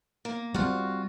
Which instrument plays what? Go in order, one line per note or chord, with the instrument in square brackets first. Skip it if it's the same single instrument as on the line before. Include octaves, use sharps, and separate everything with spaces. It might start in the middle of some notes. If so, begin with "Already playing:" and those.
[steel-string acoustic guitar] A#3
[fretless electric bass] G3 C4 [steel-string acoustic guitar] F4 F#4